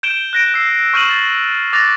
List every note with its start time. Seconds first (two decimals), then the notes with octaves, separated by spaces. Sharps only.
0.03 G6 D7 E7 G7
0.33 F#6 A#6 D7
0.54 E6 C7
0.93 C#6 F6 G6 D#7 E7 F#7
1.09 A6
1.73 D6 F#6 A6 A#6 F7